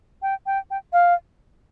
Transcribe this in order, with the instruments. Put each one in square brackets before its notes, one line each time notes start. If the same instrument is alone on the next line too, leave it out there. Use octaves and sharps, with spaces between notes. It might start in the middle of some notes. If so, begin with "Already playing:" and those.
[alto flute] G5
G5
G5
F5